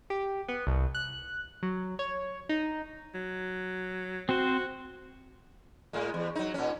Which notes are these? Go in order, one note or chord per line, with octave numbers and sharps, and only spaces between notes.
G4
B3
C2
F#6
F#3
C#5
D#4
F#3
C4 F#4 C5
A2 G#3
E2
F#3 D#4
A#2 C#4